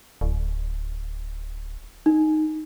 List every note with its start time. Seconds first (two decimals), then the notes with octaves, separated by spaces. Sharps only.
0.21 D1
2.06 D#4